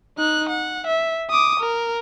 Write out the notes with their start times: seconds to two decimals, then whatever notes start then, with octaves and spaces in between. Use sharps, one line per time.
0.18 D#4 F#6
0.49 F#5
0.87 E5
1.31 D6 D#6
1.60 A#4